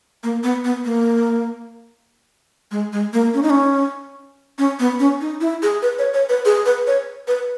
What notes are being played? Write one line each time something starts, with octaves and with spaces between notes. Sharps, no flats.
A#3
B3
B3
A#3
G#3
G#3
A#3
C#4
D#4
C#4
C#4
B3
C#4
D#4
E4
G#4
B4
C#5
C#5
B4
G#4
B4
C#5
B4